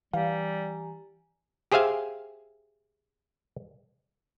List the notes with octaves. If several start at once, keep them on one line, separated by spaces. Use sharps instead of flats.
E3 G3 G4 F5 G#5 A#5
G4 G#4 C5 E5 F5 G#5